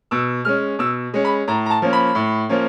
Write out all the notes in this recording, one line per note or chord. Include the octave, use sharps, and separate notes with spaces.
B2 E6
G#3 C#4 F6
B2 E6
G#3 C#4
B5
A2 A#5
A#5
A5
F3 A#3 C#4
B5
A2
F3 A#3 C#4